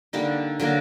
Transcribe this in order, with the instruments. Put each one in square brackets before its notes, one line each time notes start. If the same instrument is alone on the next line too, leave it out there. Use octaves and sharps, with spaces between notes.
[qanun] D3 G3 A#3 D#4
D3 F#3 A#3